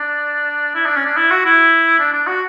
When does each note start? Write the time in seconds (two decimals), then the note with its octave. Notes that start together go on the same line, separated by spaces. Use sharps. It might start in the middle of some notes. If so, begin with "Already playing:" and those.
Already playing: D4
0.75 E4
0.86 D4
0.96 C#4
1.06 D4
1.17 E4
1.31 F#4
1.45 E4
2.00 D4
2.13 D4
2.27 F#4